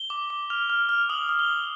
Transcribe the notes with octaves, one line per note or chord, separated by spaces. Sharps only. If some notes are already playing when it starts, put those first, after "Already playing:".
Already playing: G7
D6
D6
F6 F7
F6
F6
D#6 F#7
D#6
G7
D#6